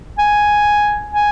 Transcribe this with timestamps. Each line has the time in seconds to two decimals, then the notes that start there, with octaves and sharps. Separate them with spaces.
0.19 G#5
1.12 G#5